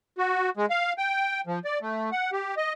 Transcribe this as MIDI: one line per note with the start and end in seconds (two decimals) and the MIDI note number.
0.18 0.50 66
0.57 0.66 56
0.70 0.93 77
0.98 1.41 79
1.47 1.59 53
1.65 1.79 74
1.82 2.10 57
2.12 2.31 78
2.32 2.55 67
2.57 2.73 75